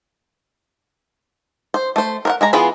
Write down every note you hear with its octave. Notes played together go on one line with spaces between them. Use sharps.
C5
A3 C5
A#4 C5 F#5
G#3 G#5 A#5
E3 B3 F4 G#4 B5